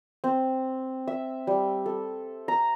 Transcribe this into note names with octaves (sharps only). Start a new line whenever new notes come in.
C4
E5
G3
A4
A#5